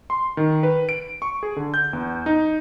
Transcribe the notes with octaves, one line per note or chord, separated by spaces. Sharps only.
C6
D#3
B4
D7
C#6
G#4
D3
G6
E2
D#4